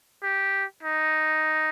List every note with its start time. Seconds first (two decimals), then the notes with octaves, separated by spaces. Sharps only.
0.23 G4
0.83 D#4